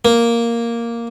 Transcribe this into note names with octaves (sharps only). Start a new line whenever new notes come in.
A#3